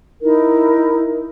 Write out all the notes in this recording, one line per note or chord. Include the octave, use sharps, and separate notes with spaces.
D#4 E4 A#4